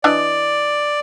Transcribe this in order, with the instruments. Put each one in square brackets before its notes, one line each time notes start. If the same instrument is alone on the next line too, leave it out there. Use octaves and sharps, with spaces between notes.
[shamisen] E3 D4 D#5 [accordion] D5